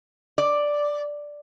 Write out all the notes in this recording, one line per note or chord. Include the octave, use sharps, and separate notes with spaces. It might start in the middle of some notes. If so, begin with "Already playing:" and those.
D5